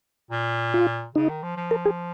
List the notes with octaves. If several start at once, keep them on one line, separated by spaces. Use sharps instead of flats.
A#2
F4
C#3 D#4
D#3
F3
F3
A#4
G#4